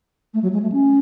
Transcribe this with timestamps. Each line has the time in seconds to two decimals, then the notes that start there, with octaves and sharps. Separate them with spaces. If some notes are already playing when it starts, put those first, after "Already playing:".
0.34 A3
0.43 F#3
0.53 G#3
0.62 A3
0.72 C#4